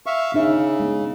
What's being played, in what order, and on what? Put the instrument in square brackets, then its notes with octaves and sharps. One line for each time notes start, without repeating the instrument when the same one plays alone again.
[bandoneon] E5 F5 C#6
[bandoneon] C#3 [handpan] D4 D#4 E5
[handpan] G#3 B3